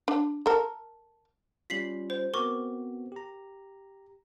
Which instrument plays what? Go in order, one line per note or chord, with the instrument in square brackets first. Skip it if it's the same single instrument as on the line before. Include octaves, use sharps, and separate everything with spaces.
[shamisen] D4
A4 A#4
[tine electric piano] G3 C#4 F4 [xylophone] B6 C7 F#7
[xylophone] C5
[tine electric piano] B3 C4 F#4 [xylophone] A#4 C#6 D6
[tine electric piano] G4 A#5